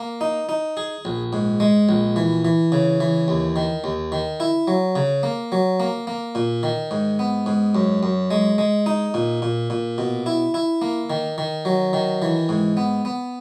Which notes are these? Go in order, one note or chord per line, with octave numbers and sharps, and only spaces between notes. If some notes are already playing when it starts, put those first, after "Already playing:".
Already playing: A#3
D#4
D#4
G#4
A#1
G#2
G#3
A#1
E3
E3
C#3
E3
D#2
D#3
D#2
D#3
E4
F#3
C#3
A#3
F#3
A#3
A#3
A#2
D#3
G#2
B3
G#2
F#2
F#2
G#3
G#3
D#4
A#2
A#2
A#2
B2
E4
E4
A#3
D#3
D#3
F#3
D#3
E3
G#2
B3
B3